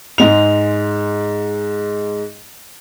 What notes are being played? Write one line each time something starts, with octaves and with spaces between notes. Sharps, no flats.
G#2 G#3 F7